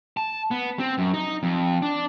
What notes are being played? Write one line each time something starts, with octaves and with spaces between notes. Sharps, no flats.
A5
B3
C4
F#2
D#4
F2
D4